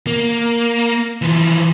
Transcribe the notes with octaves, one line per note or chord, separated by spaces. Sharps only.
A#3
E3 F3